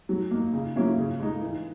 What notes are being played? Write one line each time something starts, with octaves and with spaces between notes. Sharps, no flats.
F#3
A#3 D#4
C#3
F#3 A#3 C#4 E4
C#3
G#3 D#4
E3